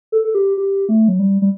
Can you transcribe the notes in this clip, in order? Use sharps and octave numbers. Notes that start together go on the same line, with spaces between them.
A4
A4
G4
G4
A3
F#3
G3
G3